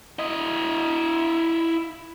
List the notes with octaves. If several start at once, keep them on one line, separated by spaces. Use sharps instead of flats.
E4 D#5